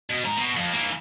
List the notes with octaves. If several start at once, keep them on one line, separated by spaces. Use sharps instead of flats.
B2
G#2 A#5
B2
F2
E3 A#3